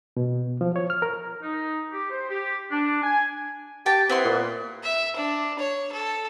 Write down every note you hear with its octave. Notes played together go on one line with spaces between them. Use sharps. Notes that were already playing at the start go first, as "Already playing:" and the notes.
B2
F3
C#5
F6
A#4
D#4
G4
C5
G4
D4
G#5
G4 G5 A5
B3 C4 E4 C6
A#2
E5
D4
C#5
A4